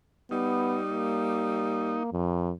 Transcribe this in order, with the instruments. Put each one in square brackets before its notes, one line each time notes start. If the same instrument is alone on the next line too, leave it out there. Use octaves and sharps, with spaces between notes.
[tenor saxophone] G3 [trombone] B3 [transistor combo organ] D#4
[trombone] A#3
F2